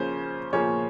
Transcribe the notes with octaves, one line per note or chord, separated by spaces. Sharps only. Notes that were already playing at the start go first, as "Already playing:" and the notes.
Already playing: C#3 F3 A#3 C#4 C5
C#3 F3 A#3 C#4 C#5